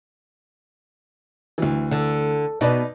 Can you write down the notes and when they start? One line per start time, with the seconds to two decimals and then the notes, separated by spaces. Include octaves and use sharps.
1.58 D2 E3
1.91 D3
2.61 B2 D#4 B4 D5